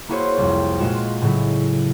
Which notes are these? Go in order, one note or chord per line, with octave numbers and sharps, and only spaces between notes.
A#3 E4 F#4 G#4 C5 C#5
C2 F2
A#2 G#3 F4 F#4 E7
A2 C#3 F#3 G#3 E4